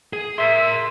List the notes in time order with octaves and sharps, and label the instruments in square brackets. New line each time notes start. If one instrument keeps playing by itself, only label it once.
[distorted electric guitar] G#4
[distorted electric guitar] A#4 C6 [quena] E5